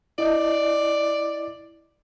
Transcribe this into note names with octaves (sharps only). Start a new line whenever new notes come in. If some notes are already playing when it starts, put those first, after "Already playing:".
E4 D5 D#5